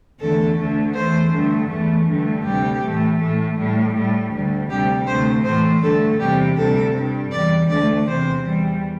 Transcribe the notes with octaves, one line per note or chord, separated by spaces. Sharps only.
E2 D3 A3 A4
D2 D3 A3
E2 E3 A3 C5
G2 D3 A3
E2 E3 A3
G2 D3 A3
D2 C3 G3 G4
A2 E3 A3
A2 A3
A2 G3
A2 G3
D2 D3 G3
D2 C3 G3 G4
D2 C3 A3 C5
A2 E3 A3 C5
G2 D3 A3 A4
E2 C3 G3 G4
D2 C3 G3 A4
G2 G3
E2 E3 G3 D5
D2 D3 A3 D5
E2 C3 E3 C5
E2 E3 G3